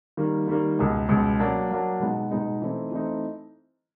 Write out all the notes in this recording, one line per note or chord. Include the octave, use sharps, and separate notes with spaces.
D#3 G3 A#3
D#3 G3 A#3
C#2 B2 G#3
C#2 B2 G#3
F#3 A#3 D4
F#3 A#3 D4
B2 G#3 B3 D#4
B2 G#3 B3 D#4
E3 A3 C4 D#4
E3 A3 C4 D#4